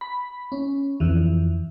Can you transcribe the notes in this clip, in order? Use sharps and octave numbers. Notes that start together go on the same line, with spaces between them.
B5
C#4
F2 E3